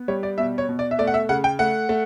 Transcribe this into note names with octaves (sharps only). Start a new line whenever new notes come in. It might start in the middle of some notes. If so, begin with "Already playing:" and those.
Already playing: B3
G3 C#5
D5
B2 E5
C#5
B2
D5
E5
A3 D5
F#5
E5
C#3 F#5
G5
A3 F#5
A3